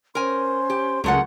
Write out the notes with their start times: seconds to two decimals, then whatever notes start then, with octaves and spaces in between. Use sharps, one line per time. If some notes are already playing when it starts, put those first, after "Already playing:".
0.15 C#4 A#4 C5 G#5 C6
0.70 G4
1.04 C#2 F#3 A3 G#4 A#4 F#5 C6